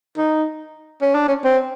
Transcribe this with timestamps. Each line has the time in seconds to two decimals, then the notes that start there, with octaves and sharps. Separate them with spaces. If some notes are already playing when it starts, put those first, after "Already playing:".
0.17 D#4
1.02 C#4
1.15 D4
1.28 C#4
1.45 C4